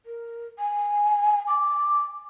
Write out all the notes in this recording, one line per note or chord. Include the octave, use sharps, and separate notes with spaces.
A#4
G#5
D6